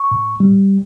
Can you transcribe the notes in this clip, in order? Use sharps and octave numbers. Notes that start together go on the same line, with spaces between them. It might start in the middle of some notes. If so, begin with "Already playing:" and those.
Already playing: C#6
A2
G3